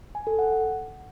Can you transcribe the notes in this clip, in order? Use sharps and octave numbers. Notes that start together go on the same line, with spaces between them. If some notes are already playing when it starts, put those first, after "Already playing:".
G#5
A4
F#5